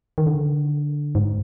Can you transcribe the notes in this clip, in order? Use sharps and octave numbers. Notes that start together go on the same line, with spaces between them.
D#3
D3
G#2